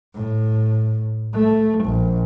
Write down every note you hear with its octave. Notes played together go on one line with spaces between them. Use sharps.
A2
A3
A#1